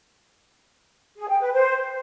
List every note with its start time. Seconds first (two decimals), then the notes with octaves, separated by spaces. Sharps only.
1.17 G#4
1.29 G5
1.40 B4
1.52 C5